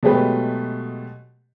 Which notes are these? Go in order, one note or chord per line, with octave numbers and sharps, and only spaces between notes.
B2 F#3 G#3 A3 G4 B4